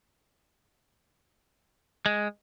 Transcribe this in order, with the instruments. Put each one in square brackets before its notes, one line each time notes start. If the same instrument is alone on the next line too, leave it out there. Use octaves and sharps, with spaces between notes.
[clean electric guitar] G#3